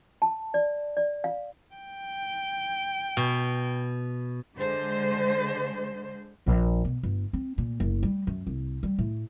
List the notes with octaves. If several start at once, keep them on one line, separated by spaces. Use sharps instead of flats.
A5
D5
D5
F5
G5
B2
D3 G#3 C5
A#1
B2
G1
C4
A#2
F#1
G3
F#2
C2
G3
A2